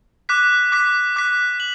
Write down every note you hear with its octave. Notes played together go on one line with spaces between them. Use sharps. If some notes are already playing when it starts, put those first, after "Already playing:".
D6 F#6 B6
D6 F#6 B6
D6 F#6 B6
F#7